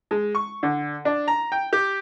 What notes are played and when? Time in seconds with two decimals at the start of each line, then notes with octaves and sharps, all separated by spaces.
0.11 G#3
0.35 C#6
0.63 D3
1.05 D4
1.28 A#5
1.52 G5
1.73 G4